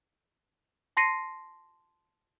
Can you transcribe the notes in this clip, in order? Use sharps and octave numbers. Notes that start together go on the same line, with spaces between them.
A5 C6 A#6 C7 C#7 D#7